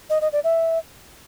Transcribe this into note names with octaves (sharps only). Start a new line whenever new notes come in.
D#5
D#5
D5
E5